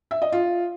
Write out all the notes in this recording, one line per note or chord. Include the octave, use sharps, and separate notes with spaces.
E5
D#5
F4